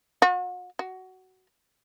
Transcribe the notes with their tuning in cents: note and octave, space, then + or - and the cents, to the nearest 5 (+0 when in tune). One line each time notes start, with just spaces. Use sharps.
F#4 -40
F#4 +15